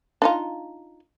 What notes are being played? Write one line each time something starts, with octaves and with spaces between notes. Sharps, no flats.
D4 D#4 F4